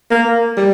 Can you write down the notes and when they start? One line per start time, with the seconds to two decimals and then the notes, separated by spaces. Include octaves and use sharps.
0.11 A#3
0.57 G3